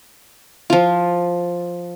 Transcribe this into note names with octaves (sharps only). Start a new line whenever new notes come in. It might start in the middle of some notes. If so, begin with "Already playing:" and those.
F3 F4